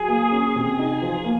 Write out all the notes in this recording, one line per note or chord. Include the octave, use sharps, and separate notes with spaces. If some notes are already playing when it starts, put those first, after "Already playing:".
Already playing: F#3 G#4
A#3
C#4
C3
D#4
F3
A#3